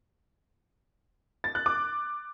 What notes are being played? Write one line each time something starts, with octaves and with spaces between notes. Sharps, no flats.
A6
F#6
D6